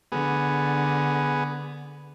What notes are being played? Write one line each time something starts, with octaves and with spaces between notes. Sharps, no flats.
D3 B3 G#4